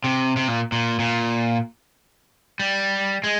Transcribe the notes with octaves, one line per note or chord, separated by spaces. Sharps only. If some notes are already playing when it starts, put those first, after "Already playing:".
C3
C3
A#2
A#2
A#2
G3
G#3